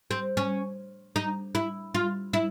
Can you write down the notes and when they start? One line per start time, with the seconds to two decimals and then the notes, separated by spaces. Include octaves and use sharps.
0.11 C4
0.37 C#4
1.16 D#4
1.55 E4
1.94 F4
2.33 E4